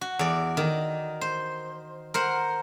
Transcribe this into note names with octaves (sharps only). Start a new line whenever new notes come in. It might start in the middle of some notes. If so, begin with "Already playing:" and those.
F#4
E2 D5
D#3
C5
A#4 C5 F#5